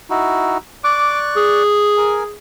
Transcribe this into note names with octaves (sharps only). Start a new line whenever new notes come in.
D#4 E4 F#4
D5 C#6 D6 F#6
G#4
A#4 G#5